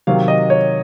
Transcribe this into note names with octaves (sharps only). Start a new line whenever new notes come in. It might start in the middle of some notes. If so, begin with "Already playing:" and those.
C3 D#3 F#3 F5
D#5
C#5